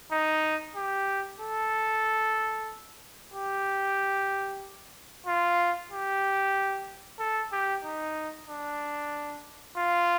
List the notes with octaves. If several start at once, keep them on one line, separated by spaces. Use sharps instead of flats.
D#4
G4
A4
G4
F4
G4
A4
G4
D#4
D4
F4